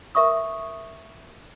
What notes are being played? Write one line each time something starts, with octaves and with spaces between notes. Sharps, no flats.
A#4 E5 C#6 D#6